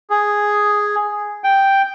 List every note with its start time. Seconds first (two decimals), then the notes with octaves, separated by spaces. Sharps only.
0.10 G#4
1.44 G5